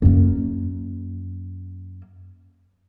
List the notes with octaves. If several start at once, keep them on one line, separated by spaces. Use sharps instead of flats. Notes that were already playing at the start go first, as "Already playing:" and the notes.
F#2 A#3